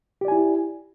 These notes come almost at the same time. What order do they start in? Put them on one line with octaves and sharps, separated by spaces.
G4 D5 G#5 E4